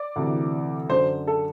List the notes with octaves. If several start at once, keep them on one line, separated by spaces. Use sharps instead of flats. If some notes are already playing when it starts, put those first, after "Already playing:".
Already playing: D5
D2 C3 E3
F#2 D3 C5
A4